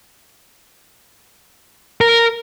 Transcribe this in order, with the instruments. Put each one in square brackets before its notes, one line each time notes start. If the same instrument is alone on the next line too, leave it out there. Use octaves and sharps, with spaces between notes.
[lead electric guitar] A#4